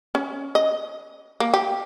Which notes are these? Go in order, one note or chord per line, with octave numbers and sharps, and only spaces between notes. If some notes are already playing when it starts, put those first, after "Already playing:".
C#4
D#5
A#3
G4